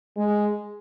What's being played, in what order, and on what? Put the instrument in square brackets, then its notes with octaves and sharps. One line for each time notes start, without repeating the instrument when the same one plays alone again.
[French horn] G#3